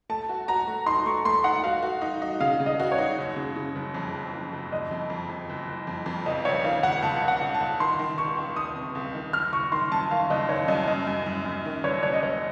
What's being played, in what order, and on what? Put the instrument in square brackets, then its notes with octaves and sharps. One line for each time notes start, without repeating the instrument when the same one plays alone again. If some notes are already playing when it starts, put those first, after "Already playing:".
[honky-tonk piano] A3 [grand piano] A5
[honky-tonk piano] F#4
[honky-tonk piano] F#4 [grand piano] A#5
[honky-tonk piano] A3
[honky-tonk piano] D#4 [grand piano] C6
[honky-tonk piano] A3 [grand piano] C#6
[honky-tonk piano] A3 [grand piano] C6
[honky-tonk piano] D#4 [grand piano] F#5
[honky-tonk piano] F#4 [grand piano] F5
[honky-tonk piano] F#4
D#4
D#4
[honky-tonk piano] C#3 [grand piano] F5
[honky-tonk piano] C#3
[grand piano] D#5
[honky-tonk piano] F#4
[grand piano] C#5
[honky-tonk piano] D#4
F#1
C#3
C#3
F#1
F2
F#1
F#1
F#1
[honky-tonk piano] F#1 [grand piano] D#5
[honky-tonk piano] F2
F2
F2
F#1
F#1
F2
F2
[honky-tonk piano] C#2 [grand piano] D#5
[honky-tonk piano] C#2 [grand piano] C#5
[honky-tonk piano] D#3 [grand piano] F5
[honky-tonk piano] C#2 [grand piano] F#5
[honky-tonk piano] C#2 [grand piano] A5
[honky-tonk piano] C#2
[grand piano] F#5
[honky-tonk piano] C#2
[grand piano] A5
[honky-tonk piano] C#2
[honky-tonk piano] D#3 [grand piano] C6
[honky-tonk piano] D#3
[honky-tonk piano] C#2 [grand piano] C#6
[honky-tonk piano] C#2
[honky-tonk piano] D#3 [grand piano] D#6
[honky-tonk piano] C3
C#2
D#3
[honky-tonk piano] F#1 [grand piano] F6
[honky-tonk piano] F#1 [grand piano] C#6
[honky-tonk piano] D#3 [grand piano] C6
[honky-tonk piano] F#2 [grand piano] A5
[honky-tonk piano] D#3 [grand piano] F5
[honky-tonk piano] F#1 [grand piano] D#5
[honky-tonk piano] D#3 [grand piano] C#5
[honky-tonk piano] F#2 [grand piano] D#5
[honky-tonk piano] F#2 [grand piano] D#5
[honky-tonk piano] F#2
F#2
F#2
D#3
[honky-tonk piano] F#1 [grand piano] C#5
[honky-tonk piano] F#1 [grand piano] C#5
[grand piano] D#5
[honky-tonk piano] F#1 [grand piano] C#5